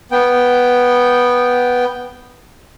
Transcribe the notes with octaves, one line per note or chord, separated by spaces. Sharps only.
B3 G5